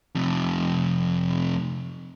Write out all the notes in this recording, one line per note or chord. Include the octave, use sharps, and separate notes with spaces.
F2 C3